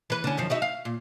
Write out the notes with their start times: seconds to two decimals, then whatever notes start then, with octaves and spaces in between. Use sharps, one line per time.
0.10 E3 B4
0.24 D3 C#4
0.37 F#2 D#3 F3
0.50 D#4 F#4 E5
0.62 F5
0.85 A#2